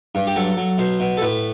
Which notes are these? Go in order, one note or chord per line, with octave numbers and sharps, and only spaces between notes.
G2
G4
F#3 A4
F#3
B2 C5
B2
A4
A2 B4